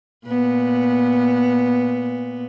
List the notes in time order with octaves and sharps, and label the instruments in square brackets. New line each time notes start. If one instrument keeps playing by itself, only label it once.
[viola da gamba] A#2 B3